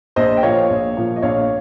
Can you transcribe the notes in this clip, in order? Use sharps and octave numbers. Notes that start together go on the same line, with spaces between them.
A#1 C5 D#5
G5
A#2 F3 C#5 F5
A#1
A#2 F3
D#5
A#1 C#5 F5